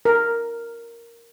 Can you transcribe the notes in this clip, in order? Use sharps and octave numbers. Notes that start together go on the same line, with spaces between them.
A#4